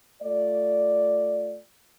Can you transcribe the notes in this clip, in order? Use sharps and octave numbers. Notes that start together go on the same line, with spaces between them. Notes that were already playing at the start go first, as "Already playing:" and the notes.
A3 F4 D5